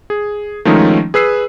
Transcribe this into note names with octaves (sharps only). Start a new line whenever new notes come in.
G#4
D#3 F3 G#3 A3 C#4 D#4
G#4 B4 E6 C7